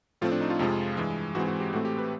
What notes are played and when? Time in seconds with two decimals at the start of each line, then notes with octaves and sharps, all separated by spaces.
0.21 A2 F3 A3 C4 F4
0.31 D4
0.41 D#4
0.50 F4
0.59 F2 C3 F3 G#3
0.97 G2 E3 G#3
1.35 G#2 E3 G#3 C4 F#4
1.48 F#4
1.60 G4
1.73 A2 E3 A3 C4 F#4
1.85 G4
1.98 B4